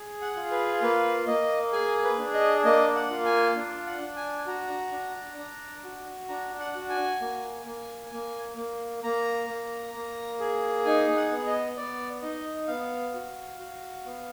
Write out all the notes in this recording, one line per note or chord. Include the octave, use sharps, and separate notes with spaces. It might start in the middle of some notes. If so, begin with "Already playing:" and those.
Already playing: G#4
F#5
F4
B4
A#3 B4
A#3 D#5
G#4 G#5
B4
D4
D#5
A#3 D#5
F#5
F4
G#5
D4
F#5
D4
G#5
F#4 A#5
D4
D4
F#4
D4 A#5
F#5
F#4
G#5
A#3
A#3
A#3
A#3
A#3 A#5
A#3
A#3
G#4
D#4 G#5
F#5
B3
D#5
B3 D5
D#4 D#5
B3 F5
F#4
F#4
B3